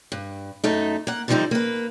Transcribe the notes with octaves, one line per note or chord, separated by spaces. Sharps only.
G2
F#2 A3 D#4
A#3 F#5
D3 D#3 F3 G3 D#4 E4
A#3 B4